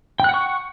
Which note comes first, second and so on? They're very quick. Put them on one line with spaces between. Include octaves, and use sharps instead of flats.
G5 F#6 F#5 C#6